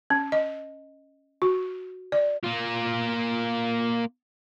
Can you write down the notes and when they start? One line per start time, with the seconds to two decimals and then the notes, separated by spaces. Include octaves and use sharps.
0.10 C#4
0.32 D#5
1.42 F#4
2.12 D5
2.44 A#3 F4